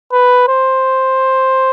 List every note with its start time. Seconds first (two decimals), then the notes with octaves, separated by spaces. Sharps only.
0.13 B4
0.48 C5